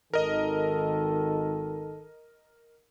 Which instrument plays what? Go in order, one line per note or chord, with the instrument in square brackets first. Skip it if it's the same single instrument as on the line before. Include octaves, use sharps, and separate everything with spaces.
[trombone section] G#1 D#3 A4 [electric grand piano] A#4 D#5